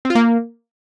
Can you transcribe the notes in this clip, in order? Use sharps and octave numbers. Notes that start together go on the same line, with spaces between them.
C4
F4
A#3